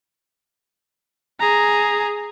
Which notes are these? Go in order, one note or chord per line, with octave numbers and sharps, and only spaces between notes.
G#4 A#5